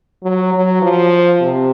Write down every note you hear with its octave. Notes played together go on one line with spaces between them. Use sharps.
F#3
F#3
F3
C3